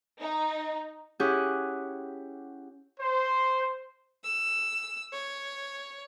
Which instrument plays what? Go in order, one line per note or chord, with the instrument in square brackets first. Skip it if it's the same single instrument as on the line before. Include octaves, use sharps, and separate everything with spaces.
[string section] D#4
[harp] C#4 E4 G4 G#4 F#5
[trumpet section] C5
[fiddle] E6
C#5